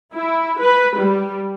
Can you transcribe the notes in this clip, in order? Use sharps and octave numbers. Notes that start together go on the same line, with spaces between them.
E4
B4
G3